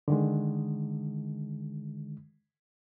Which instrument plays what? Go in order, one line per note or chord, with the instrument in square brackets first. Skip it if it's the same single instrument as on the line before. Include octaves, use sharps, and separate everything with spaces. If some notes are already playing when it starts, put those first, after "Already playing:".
[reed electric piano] D3 D#3 G#3